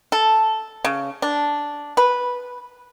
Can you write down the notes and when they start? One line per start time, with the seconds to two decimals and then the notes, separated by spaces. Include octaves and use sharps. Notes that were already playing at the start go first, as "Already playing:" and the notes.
0.12 A4
0.85 C#3
1.22 D4
1.97 B4